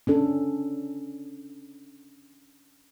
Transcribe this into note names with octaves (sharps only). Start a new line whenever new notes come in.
C#4 D4 A4